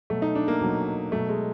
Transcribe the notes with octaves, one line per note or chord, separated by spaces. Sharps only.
B2 F#3 A3
D#4
D4
A#3
B2 F#3
B2 F#3 A3
G#3